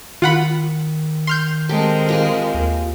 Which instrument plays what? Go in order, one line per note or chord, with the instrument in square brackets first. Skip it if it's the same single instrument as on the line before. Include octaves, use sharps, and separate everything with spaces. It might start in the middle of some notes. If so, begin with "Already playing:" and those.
[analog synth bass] D#3 [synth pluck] F4 F#5 B5
[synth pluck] C6 F6 G6
[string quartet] G#3 C4 A#4 [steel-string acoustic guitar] G4 A4
[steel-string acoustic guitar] F4 G4 G#4
[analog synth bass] D#2